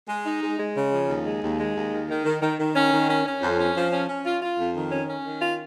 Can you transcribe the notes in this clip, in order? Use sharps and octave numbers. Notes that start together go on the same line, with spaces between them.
G#3
D#4
G#3
G#3
C#3
F3
D#2
G#3
D#2
G#3
D#2
D#3
D#3
D#3
D#3
D#3
C#4
D#3
C#4
C#4
F2
C#4
F3
C#4
C#4
F4
F4
F2
D#3
C#4
C#4
D#3
F4